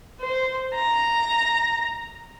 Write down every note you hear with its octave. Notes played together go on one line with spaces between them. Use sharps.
C5
A#5